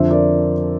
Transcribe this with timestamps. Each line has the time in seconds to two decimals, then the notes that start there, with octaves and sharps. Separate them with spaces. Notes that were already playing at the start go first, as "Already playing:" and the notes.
Already playing: F2 D3 F3 C5 E5
0.11 A#4 D5